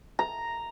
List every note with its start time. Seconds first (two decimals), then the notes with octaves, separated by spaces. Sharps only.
0.19 A#5